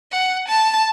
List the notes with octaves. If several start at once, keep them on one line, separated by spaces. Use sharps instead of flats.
F#5
A5